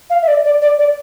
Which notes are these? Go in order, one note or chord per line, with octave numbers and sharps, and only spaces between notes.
F5
E5
D5
D5
D5
D5